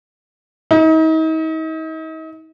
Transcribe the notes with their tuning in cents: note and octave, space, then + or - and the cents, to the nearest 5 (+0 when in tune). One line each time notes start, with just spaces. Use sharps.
D#4 +40